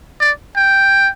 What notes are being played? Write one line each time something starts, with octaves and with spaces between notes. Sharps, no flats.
D5
G5